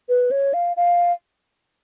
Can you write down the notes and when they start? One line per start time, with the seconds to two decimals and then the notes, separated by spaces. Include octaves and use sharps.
0.09 B4
0.31 C#5
0.54 F5
0.77 F5